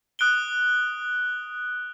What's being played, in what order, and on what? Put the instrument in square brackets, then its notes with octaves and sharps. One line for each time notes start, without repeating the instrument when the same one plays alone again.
[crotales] D#6 F#6 D7 G7